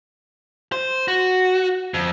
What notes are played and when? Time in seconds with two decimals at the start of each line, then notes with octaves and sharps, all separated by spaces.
0.72 C5
1.08 F#4
1.94 F2